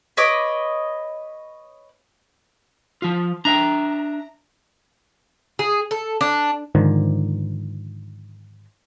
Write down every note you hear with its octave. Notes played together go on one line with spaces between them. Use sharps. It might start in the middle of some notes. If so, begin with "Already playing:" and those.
B4 C#5 D#5 D6
F3 F4
D4 E5 G5 A#5
G#4
A4
D4
G#2 D3 D#3 F3